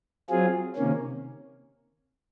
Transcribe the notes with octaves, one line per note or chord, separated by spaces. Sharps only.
F#3 C4 F4 G#4
C3 D#3 A#3 C#4